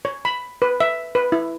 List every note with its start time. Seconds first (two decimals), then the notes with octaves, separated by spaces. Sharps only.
0.05 C#5
0.25 B5
0.62 B4
0.80 E5
1.15 B4
1.32 E4